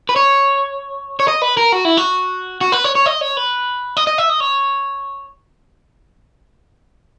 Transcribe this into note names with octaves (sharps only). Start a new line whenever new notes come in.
B4
C#5
C#5
D#5
B4
A#4
F#4
E4
F#4
F#4
B4
C#5
C#5
D#5
C#5
B4
D#5
D#5
E5
D#5
C#5